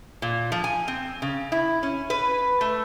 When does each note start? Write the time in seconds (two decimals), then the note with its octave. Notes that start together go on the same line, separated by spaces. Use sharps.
0.22 A#2
0.52 F3
0.64 G#5
0.88 C4
1.22 C#3
1.52 E4
1.83 C#4
2.10 B4
2.61 A3